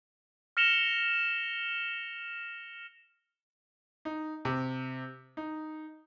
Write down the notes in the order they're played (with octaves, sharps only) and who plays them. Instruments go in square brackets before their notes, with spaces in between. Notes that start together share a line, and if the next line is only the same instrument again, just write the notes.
[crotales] F6 A#6 C#7 E7 F7 G7
[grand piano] D#4
C3
D#4